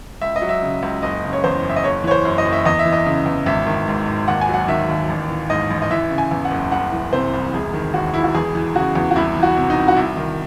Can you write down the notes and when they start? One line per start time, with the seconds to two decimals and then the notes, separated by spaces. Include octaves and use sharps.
0.22 C#2 E5
0.36 D#5
0.42 F#3
0.49 E5
0.63 C#3
0.83 C#2
1.03 F#1 D#5
1.24 C#3
1.33 C#5
1.44 E2 C5
1.64 F#1 E5
1.76 D#5
1.84 F#1 C#5
2.04 E3 C#5
2.11 C5
2.25 F#2
2.38 D#5
2.45 F#1
2.53 E5
2.66 E2 D#5
2.79 E5
2.85 E3
2.92 D#5
3.06 C#3
3.26 E2
3.46 G#1 E5
3.67 D#3
3.88 G#2
4.08 G#1
4.28 D#2 F#5
4.41 G#5
4.49 F#3 F#5
4.68 D#3 E5
4.89 D#2
5.09 A1
5.29 E3
5.50 G#2 D#5
5.70 A1
5.82 D#5
5.91 E3 E5
6.11 C#3
6.18 G#5
6.31 E2
6.45 F#5
6.51 F#1
6.72 C2 F#5
6.92 E3
7.13 C3 C5
7.33 C2
7.53 E1 G#4
7.74 D#3
7.93 D#2 F#4
8.14 E1 E4
8.24 F#4
8.35 E2 G#4
8.55 E3
8.75 C#3 F#4
8.95 E2
9.11 F#4
9.16 C2 E4
9.37 E3
9.43 F#4
9.57 C3
9.70 D#4
9.76 C2
9.88 F#4
9.96 C2 E4
10.17 D#3